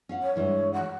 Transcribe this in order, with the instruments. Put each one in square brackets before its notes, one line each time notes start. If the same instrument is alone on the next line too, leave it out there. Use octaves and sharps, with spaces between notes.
[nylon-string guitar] C#4 F5 F#5
[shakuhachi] C#5
[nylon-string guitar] G2 E3 G#3
[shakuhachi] F#5